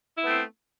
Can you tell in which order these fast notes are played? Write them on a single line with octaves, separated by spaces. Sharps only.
E4 B3 A3 C4